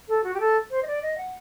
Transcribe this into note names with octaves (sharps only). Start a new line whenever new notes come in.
A4
F#4
G4
A4
C5
D#5
D5
D#5
F#5